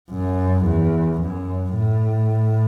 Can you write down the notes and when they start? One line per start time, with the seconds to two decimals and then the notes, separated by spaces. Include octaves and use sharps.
0.11 F#2
0.66 E2
1.21 F#2
1.76 A2